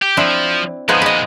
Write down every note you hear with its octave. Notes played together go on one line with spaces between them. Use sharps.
G4
F3 C4 D4 E4
A#2 F3 G#3 B3 D#4
B4 D#5